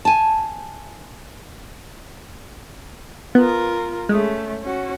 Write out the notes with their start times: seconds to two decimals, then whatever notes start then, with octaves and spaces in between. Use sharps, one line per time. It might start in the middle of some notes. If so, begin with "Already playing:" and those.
0.05 G#5 A5
3.35 B3 F4 A#4
4.09 G#3 A3 C#4
4.62 C#4 F#4